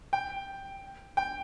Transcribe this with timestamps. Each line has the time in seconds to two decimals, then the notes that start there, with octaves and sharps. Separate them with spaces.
0.13 G5
1.17 G5